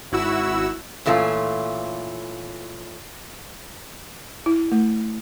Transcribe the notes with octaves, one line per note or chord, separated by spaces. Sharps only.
G#1 E4 F#4 E6
A#2 E3 A3 C#4 F4
E4
A3